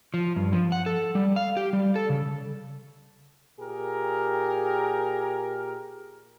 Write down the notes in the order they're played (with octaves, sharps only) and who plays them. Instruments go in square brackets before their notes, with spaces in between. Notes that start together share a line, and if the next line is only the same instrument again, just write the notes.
[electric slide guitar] F3
G2
F3
F#5
A4
G3
F5
G4
G3
A4
C#3
[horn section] A#2 G4 G#4 A#4